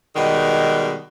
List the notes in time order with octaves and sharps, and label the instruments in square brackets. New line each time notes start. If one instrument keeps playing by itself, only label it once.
[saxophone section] B2 D#3 G3 G#3